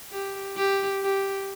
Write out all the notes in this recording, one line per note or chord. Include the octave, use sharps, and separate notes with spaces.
G4
G4
G4